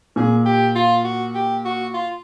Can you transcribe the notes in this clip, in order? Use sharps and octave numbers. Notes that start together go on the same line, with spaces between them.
A#2 G#4
G4
F4
F#4
G4
F#4
F4